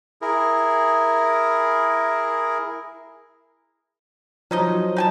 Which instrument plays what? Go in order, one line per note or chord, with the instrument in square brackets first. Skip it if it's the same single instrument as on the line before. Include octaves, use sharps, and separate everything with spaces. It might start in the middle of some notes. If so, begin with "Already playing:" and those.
[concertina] E4 G#4 A#4
[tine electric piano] F3 F#3 [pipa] C#4 D#4 D#5
[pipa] D#4 G#5 A5